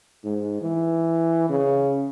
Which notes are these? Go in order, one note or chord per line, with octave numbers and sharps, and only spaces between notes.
G#2
E3
C#3